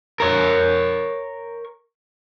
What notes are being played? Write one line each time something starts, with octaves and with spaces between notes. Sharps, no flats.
A#4 C#5